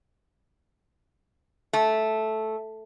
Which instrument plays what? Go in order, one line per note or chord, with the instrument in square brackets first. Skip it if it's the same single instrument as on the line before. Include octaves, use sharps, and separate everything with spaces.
[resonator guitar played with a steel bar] A3